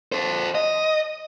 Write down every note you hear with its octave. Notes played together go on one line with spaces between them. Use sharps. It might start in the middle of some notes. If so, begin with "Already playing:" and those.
A4 C5
D#5